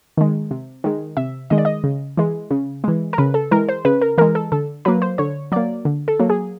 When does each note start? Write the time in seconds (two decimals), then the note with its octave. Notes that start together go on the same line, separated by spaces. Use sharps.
0.17 D#3 G#3
0.51 C3
0.84 D#3 G#3
1.17 C3 E5
1.50 D#3 G#3 D#5
1.58 D5
1.65 D#5
1.84 C#3
2.17 E3 G#3
2.51 C#3
2.84 E3 G#3
3.13 A#4
3.18 C#3 B4
3.34 A4
3.51 E3 G#3 A#4
3.69 C5
3.85 C#3 B4
4.01 A#4
4.18 E3 G#3 A#4
4.35 A4
4.52 D3 A4
4.85 F#3 A#3 B4
5.02 C5
5.18 D3 C#5
5.52 F#3 A#3 D5
5.85 D3
6.08 A4
6.20 F#3 A#3
6.30 G#4